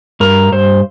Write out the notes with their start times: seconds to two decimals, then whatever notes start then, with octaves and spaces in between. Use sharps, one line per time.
0.20 G2 A#4
0.52 G2 C5